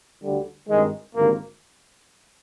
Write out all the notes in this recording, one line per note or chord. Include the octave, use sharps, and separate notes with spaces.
D2 D3 G3
G#1 G2 D#3 G#3
G#1 G2 D3 A#3